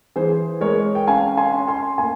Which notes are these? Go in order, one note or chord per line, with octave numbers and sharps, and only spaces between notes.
E3 G#4 C5
G#3 A#4 C#5
G5
C#4 F5 G#5
G#5 C6
C#4
G#5 C6
A#3 G#5 C6